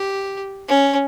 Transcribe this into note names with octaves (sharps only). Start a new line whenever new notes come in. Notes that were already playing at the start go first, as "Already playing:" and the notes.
Already playing: G4
C#4